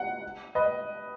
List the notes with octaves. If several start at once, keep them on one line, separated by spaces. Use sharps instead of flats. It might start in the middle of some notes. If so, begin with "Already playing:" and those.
Already playing: F#5
B4 D#5